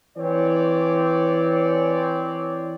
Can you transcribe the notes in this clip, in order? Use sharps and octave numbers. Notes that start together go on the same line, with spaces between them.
E3 C4 C#5 D5